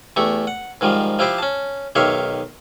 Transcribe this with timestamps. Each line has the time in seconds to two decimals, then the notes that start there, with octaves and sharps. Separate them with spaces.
0.16 E2 A3 G4 C#6
0.47 F#5
0.81 G#2 D#3 F3 G3
1.19 F3 E4 G4 C5 D5
1.38 C#4 A5
1.95 B1 D#3 G4 C#5 E5 F5